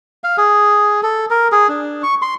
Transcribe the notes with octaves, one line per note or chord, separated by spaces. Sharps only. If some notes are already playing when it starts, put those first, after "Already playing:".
F5
G#4
A4
A#4
G#4
D4
C#6
C6